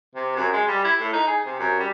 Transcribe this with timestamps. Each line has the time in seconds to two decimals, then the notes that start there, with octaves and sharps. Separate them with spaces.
0.15 C3
0.36 F#2
0.53 G#3
0.68 G3
0.85 E4
1.00 A2
1.13 D#4
1.28 G#4
1.46 C3
1.60 F#2
1.79 G3